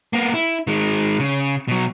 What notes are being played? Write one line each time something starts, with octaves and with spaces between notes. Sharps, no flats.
A#3 B3
E4
D#3 G#3
C#3
B2 F#3